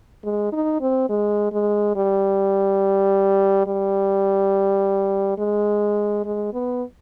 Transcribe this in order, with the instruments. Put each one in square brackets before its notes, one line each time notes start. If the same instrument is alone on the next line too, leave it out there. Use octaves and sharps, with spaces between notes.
[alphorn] G#3
D#4
C4
G#3
G#3
G3
G3
G#3
G#3
B3